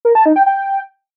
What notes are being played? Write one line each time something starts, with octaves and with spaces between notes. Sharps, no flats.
A#4
A5
D#4
G5
G5